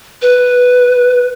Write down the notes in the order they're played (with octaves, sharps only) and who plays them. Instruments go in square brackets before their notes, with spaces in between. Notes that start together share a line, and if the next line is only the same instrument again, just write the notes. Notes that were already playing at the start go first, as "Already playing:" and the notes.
[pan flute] B4